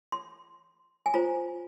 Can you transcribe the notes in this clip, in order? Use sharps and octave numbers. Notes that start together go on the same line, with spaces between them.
C6
G#5
F4 C5 A#5